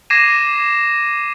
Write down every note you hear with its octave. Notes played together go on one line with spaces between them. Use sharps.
D6 G#6 A#6 C7 D#7 E7